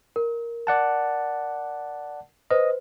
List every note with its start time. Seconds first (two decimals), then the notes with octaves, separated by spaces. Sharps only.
0.16 A#4
0.67 D5 F#5 A5
2.51 B4 C5 D#5